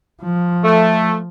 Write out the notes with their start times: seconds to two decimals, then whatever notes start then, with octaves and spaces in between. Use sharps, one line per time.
0.23 F3
0.65 A3